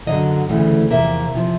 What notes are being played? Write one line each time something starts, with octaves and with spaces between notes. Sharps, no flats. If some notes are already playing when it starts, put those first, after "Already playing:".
F#2 D3 F#3 D#5
D2 C#3 E3 A3
E2 C3 F3 A#3 E5
E2 C3 F3